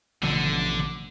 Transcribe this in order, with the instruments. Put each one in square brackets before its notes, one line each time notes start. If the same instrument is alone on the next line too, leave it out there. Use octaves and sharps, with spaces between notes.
[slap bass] A1 B2 F3 [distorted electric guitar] D3